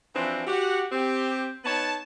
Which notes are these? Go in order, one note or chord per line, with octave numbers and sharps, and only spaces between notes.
E3 F3 C4 D4 E4 F#4
F#4 G4 F#5
C4 G4
B3 D#4 C#5 A5